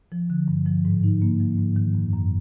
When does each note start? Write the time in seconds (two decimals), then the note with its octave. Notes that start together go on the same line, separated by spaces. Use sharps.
0.12 F3
0.30 D3
0.48 G2
0.66 F3
0.85 G#2
1.04 D#4
1.22 A#3
1.40 F3
1.58 G#2
1.76 D#3
1.95 F#2
2.13 F#2